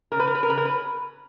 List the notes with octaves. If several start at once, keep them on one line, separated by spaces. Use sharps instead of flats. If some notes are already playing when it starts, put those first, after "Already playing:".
C#3 A#4
B4
A#4
B4
A#4
C#3 B4
A#4
B4